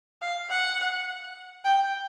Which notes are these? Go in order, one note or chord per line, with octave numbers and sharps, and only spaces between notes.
F5
F#5
G5